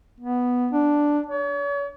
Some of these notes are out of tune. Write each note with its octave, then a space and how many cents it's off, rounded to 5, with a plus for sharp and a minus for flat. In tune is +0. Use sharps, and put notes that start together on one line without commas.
B3 -5
D4 +0
C#5 +40